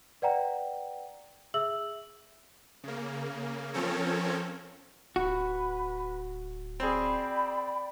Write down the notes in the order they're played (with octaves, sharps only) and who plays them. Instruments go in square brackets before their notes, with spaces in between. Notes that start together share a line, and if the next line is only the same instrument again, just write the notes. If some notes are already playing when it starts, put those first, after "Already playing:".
[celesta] B4 D5 F#5 G5 A#5
G#4 E5 E6 F#7
[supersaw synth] C#3 A#3
F3 C4 C#4 A4 A#4 C#5
[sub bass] D1 [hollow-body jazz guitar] F#4 [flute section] B4
[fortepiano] C4 G#4 [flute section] D5 G5 B5